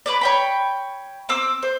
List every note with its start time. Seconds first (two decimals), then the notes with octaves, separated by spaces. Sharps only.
0.06 B4 C#5 D5
0.21 C#5 G5 B5
1.29 C4 D6 E6
1.63 C5